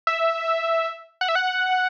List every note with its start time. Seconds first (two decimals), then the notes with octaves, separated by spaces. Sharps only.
0.07 E5
1.21 F#5
1.28 E5
1.35 F#5